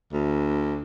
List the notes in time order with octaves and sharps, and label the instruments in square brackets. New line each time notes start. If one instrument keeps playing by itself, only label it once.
[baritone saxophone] D2